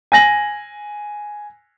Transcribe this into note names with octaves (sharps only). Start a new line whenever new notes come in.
G#5 A#6 F#7